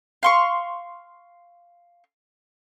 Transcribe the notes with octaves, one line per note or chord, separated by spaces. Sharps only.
F5 C6 C#6